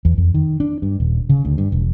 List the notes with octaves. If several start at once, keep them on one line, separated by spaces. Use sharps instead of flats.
E2
F2
D#3
D4
G2
D#1
C#3
D2
G2
E1